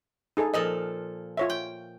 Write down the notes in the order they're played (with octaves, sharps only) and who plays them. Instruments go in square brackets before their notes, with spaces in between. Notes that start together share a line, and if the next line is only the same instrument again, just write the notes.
[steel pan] D#4 G#4 A4
[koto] A#2 F3 A4 [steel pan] D#5
[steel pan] F4 C#5 E5
[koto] G5